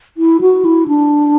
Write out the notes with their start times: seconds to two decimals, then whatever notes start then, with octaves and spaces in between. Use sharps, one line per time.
0.17 E4
0.41 F#4
0.65 E4
0.88 D4